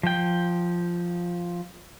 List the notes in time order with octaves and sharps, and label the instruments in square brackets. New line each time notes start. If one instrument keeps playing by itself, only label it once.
[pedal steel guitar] F3 G5